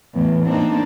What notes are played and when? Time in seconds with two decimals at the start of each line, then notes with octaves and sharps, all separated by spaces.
0.12 E2 A2
0.47 A#3 C4 D4 D#4